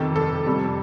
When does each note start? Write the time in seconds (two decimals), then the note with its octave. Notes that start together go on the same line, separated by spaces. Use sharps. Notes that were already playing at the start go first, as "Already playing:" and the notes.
Already playing: F2 C3 D#3 A4
0.16 A4
0.46 F2 C3 G3